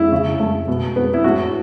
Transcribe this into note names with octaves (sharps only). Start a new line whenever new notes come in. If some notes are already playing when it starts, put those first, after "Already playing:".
Already playing: E4
C#3
A3
B2
B3
E4
A2 F#4